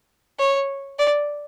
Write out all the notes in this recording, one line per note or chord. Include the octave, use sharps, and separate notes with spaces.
C#5
D5